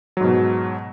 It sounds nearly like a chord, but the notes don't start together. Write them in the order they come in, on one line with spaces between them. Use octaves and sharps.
F#3 G#2 B2